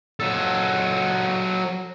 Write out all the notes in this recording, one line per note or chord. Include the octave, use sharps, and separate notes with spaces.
F#3 A4